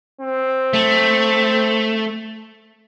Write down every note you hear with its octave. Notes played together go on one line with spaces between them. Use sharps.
C4
A3